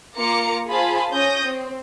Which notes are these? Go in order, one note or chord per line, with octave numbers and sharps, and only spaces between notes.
A#3 F4 A#5 D6 C#7
F4 G#4 C5 G#5 A5 B5
C#4 C#5 D#6 G6 A#6
C4